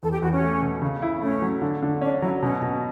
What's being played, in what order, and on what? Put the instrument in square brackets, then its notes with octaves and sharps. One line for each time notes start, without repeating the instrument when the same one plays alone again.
[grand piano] E2 [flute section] A4
[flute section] G4
[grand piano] E2 [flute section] F#4
[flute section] C#4
[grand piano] A3
B2
C#3
E4
[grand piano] A3 [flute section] C#4
[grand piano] F#3
D3
D3
[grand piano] C#4 [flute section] D4
[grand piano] F#3 [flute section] E4
[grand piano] B2 [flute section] C#4
[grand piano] B2